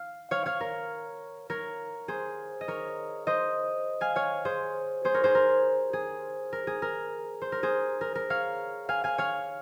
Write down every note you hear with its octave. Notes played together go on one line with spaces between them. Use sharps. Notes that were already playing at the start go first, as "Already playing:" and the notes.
Already playing: F5
C#5 F5
C#5 F5
A#4
A#4 C#5
G#4 C5
D#5
A#4 C#5
C5 D#5
F5 G#5
C#5 F5
G#4 C5
G#4 C5
A#4 C#5
G#4 C5
A#4
G#4
A#4
G#4
A#4
C5
A#4
G#4 C5
A#4
A#4
C#5 F5
F5 G#5
F5 G#5
C#5 F5